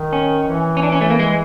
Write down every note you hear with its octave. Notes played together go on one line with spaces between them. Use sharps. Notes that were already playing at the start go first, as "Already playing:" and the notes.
Already playing: D#3
C#4
E3
C#4
D4
C#4
A3
A#3
G#3